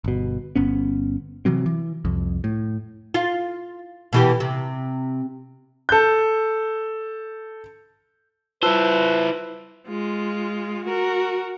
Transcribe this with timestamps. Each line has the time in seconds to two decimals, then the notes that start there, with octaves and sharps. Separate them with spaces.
0.04 G1 B2
0.56 G1 B3 C#4
1.45 C3 E3 F#3 C4
1.66 E3
2.05 C2 F2
2.44 A2
3.14 F4
4.13 B2 E3 G4
4.40 C3
5.89 A4 G6
8.63 E4 F4 B4 C5 A5 E6
9.87 G#3 F4
10.85 F#4 A#4